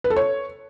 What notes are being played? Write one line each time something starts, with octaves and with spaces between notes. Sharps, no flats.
B4
A4
C#5